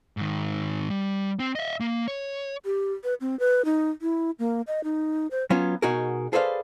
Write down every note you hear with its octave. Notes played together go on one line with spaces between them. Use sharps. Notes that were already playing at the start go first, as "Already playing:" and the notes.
G#2 D#3
G3
C4
D#5 E5
A#3
C#5
G4
B4
C4
B4
D#4
E4
A#3
D#5
D#4
C5
F#3 B3 C#4 F4
B2 D#4 F#4 G#4 A#4
G#4 A4 B4 C5 D5 F5